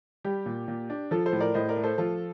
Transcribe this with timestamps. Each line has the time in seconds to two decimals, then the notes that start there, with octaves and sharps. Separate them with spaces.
0.24 G3 G4
0.46 A#2
0.68 A#2
0.90 D4
1.11 F3 F4 A4
1.26 A4 C5
1.33 A2
1.40 A#4 D5
1.54 A2 C5 D#5
1.69 A#4 D5
1.77 A3
1.83 A4 C5
1.98 F3 F4 A4